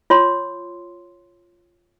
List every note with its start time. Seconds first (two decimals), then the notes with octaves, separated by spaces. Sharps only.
0.10 F4 C#5 C6